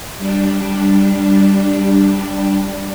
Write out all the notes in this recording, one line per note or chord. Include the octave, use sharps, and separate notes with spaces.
G3 D4